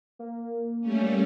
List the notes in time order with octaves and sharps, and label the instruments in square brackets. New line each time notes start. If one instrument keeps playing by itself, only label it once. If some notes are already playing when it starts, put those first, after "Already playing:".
[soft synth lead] A#3
[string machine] G3 A3 C#4